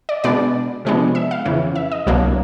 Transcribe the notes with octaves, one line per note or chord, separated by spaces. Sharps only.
D5
B2 G#3 B3 D4 D5
C3 F3 G#3 B3 D4
E5
F5
F2 C#3 E3
E5
D#5
C2 B2 F#3 A#3 D4